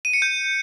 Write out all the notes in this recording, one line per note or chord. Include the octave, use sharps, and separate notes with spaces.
D#7
C#7
G6